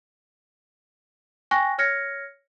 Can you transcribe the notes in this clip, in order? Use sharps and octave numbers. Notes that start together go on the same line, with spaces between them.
G5 G#5 C#6 F#6 A#6
C#5 F6 G#6 A#6 C#7